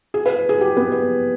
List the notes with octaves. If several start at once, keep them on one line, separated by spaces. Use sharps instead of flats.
G#4
B4
G#4
G4
B3
B3